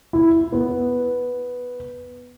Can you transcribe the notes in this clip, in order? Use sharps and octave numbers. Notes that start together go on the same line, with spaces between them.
E4
B3